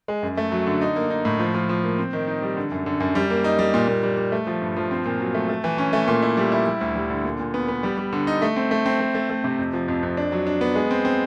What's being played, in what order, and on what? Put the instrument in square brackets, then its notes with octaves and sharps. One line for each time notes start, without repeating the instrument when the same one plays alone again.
[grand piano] G#3
F#2
A3
F#3
D3
D#4
A#3
D#4
A2
F3
F3
F3
A#3
C4
D#3
D#4
G3
D3
F#2
D3
F#2
G3
A#3
D#4
G3
A#2
A#2
G3
G3
A3
F3
G2
F3
C4
A#2
F#3
A3
A3
E3
C#4
A3
A#2
E4
G3
E4
G3
D2
G3
D3
A#2
A#2
B3
B3
G3
G3
D3
D#4
A3
C4
A3
C4
A3
A3
A3
C3
F2
F3
F2
F2
D4
F#3
D4
B3
G#3
C4
C4